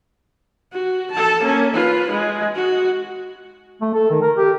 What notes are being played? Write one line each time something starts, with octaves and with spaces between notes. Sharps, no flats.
F#4
A4 A5
A#3 C#4
F4 B4
G#3
F#4
A3
A4
D#3
A#4
G4